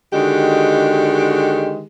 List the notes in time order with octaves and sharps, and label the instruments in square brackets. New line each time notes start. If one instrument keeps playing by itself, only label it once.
[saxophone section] D3 D#3 G#3 F#4 G4